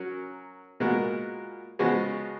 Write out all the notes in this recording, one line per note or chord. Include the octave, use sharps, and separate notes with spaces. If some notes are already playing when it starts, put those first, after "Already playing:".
Already playing: F#3 C#4 F#4 A#4
A#2 G#3 B3 F#4 A#4
C#3 F3 G#3 B3 F#4